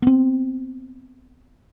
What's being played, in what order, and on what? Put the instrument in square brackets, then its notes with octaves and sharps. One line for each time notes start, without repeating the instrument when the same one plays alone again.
[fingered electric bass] B3 C4